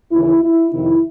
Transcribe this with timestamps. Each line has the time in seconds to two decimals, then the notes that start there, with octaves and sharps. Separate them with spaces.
0.12 D#2 C#3 E3 E4
0.42 E4
0.72 F2 C3 D#3 E4